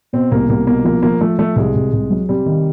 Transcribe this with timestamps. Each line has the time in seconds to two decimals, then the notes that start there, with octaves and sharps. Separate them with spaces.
0.13 B2 C4
0.31 C2 A#3
0.49 C2 A#3
0.67 B2 A#3
0.84 F3 A#3
1.02 F3 A#3
1.21 F3 A3
1.39 F3 A3
1.56 C2 G#3
1.75 C2
1.93 C2
2.10 F#3
2.29 C3 G3
2.46 D#3